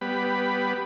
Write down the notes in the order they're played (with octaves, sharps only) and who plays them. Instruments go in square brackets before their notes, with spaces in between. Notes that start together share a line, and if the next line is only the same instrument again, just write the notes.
[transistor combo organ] G3 B3 B5